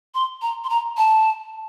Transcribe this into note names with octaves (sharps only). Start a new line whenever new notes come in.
C6
A#5
C6
A#5
A5